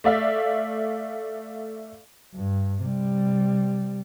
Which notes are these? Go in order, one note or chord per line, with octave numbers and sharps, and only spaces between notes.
A3 D5 E5 F5
G2
C3 G3